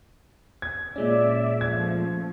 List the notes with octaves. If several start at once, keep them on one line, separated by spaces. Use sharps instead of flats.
G#6
A#2 G#3 C#4 D5 E5
F3 A3 G#6